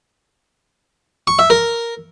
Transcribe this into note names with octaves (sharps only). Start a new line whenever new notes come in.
C#6
E5
A#4